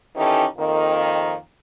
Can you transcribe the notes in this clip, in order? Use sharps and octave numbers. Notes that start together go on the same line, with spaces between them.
D#3 E3 C#4 D#4 G4 A4
F2 D#3 A#3